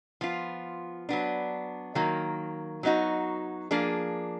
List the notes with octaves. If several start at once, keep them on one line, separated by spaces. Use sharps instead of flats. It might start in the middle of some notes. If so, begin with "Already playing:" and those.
F3 B3 F4
F#3 B3 D4
D#3 F#3 A#3
F#3 B3 D#4 F#4
F3 A#3 D4 G#4